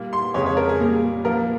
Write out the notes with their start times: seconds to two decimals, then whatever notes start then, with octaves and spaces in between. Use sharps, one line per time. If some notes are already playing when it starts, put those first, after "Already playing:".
Already playing: A#2 G3 A#3
0.13 C6
0.34 F2 C#3 G#3 C#5
0.46 C#5
0.57 A#4
0.69 G#4
0.80 A#2 G3 A#3
1.25 A#2 F3 A#3 A#4